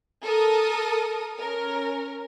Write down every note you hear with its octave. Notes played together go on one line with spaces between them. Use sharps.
A4 A#4 D#6
C#4 A#4